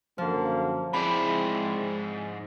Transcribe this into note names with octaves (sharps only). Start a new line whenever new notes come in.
F#2 D3 F3 A#3
G#2 G#3 C4 E4 D5 B5